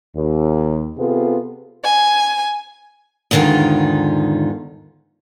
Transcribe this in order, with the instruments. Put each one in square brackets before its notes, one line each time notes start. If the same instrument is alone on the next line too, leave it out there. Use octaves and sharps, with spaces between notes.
[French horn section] D#2
C3 B3 F4 G#4 A4
[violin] G#5
[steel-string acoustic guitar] E2 G#2 D3 D#3 F4